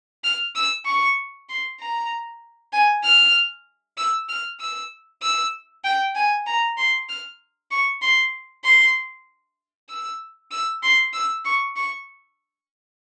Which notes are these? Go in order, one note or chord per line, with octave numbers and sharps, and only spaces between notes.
F6
E6
C#6
C6
A#5
G#5
F6
E6
F6
E6
E6
G5
G#5
A#5
C6
F6
C#6
C6
C6
E6
E6
C6
E6
C#6
C#6